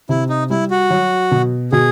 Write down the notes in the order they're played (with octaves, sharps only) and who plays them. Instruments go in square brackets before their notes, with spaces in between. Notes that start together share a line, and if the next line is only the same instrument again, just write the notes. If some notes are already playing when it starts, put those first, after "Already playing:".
[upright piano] C3 [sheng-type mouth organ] E4
[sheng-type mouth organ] D#4
[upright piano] G3 [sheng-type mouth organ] E4
[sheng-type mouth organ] F#4
[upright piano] F#3
B2
[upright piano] B2 [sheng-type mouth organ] G#4